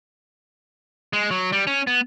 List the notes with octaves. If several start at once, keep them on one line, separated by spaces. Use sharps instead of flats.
G#3
F#3
G3
C#4
B3